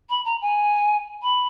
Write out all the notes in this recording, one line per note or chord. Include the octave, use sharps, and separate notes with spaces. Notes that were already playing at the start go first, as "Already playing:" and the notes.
B5
A#5
G#5
B5